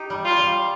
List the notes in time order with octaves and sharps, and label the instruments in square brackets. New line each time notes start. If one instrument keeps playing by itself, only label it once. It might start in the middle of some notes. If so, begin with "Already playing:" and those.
Already playing: [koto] D#4 G4
G3
[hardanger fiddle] F4
[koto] G3